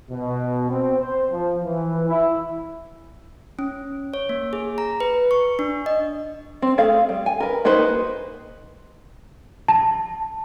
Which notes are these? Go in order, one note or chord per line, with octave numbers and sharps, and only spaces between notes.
B2
C4
C5
F3
E3
E4
C#4
C#5
A#3
G#4
A#5
B4
C#6
D4
D#5
C4
A3 G#4 F5
G3
G#5
A#4 B4
A#3 D#4 F#4 B4 C5
A5